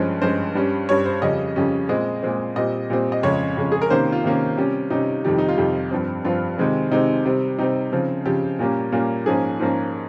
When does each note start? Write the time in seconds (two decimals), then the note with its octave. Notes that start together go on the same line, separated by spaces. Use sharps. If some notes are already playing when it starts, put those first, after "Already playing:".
Already playing: G2 F3 G#3 C#4
0.22 G2 F3 G#3 C#4 C5
0.55 G2 G3 C#4
0.89 G2 G3 C#4 C#5
1.05 C5
1.22 F2 C#3 G3 C#4 D#5
1.56 F2 C#3 G3 C#4
1.89 A#2 G#3 C4 D#5
2.23 A#2 G#3 C4
2.56 A#2 G3 C4 D#5
2.90 A#2 G3 C4
3.12 D#5
3.23 F2 C#3 G#3 C#4 C#5
3.57 F2 C#3 G#3 C#4
3.72 G#4
3.82 A#4
3.90 C3 D#3 A#3 C#4 C5
4.12 F4
4.24 C3 D#3 A#3 C#4
4.57 C3 G3 C#4
4.90 C3 G3 C#4 D#4
5.25 F2 C3 D#3 G3
5.38 D#4
5.48 F4
5.57 F2 C3 D#3 G3 G4
5.91 G2 F3 C4
6.25 G2 F3 C4 F4
6.58 C3 D#3 G#3 C4
6.91 C3 D#3 G#3 C4 D#4
7.25 C3 G3 C4
7.59 C3 G3 C4 D#4
7.92 C#3 F3 C4
8.26 C#3 F3 C4 G4
8.59 A#2 G3 A#3 C#4
8.92 A#2 G3 A#3 C#4
9.26 G#2 F3 A#3 C#4 G#4
9.60 G#2 F3 A#3 C#4